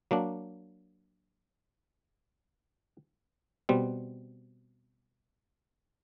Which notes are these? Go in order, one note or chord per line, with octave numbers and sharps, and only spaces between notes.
F#3 A#3 D4
B2 G3 C4